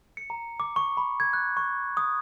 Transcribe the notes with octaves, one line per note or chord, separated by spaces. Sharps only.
C#7
A#5
D6
C#6
B5
G#6
F#6
C#6
D#6